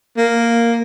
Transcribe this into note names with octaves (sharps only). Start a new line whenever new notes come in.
A#3